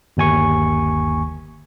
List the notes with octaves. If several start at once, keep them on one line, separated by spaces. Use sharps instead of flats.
G1 D#2 G#5 C#6